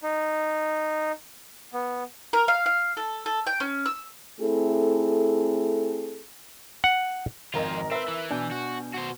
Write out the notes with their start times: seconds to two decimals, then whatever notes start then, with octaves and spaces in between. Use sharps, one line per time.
0.03 D#4
1.74 B3
2.33 A#4
2.48 F5
2.66 F5
2.97 A4
3.26 A4
3.47 G5
3.60 C#4
3.86 E6
4.40 A3 C4 E4 G#4 A4
6.84 F#5
7.54 G#1 F2 F4 A#4 D#5
7.91 C4 A#4 B4 E5
8.08 E3
8.31 B2 D4 G#5 G6
8.51 F#4
8.94 F#4 C5